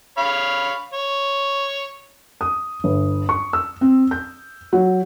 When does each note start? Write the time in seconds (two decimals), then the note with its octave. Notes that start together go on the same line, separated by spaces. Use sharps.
0.18 C#5 F5 B5
0.94 C#5
2.41 D#6
2.84 G1
3.29 C#6
3.53 E6
3.81 C4
4.11 G6
4.73 F#3